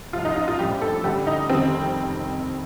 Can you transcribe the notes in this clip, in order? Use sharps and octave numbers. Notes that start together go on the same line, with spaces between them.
C2 C3 F3 F4
D#4
D#4
F4
A#1 A2 G3 G4
A4
D2 D3 G3 G4
D#4
F1 F2 C3 D#3 G3 C4